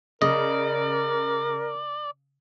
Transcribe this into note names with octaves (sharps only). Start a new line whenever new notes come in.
C#3 A#4 D5 D#5